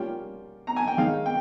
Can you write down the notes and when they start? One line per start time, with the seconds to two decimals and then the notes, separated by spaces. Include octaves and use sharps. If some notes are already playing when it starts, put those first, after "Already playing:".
Already playing: G3 A#3 C#4 F4 G5
0.67 A#5
0.76 G#5
0.88 G5
0.97 D#3 G#3 D#4 F5
1.26 G5